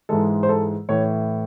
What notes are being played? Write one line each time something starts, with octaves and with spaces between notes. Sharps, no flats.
G#2 E3 G#3 A4
C5
A4
A2 E3 C#5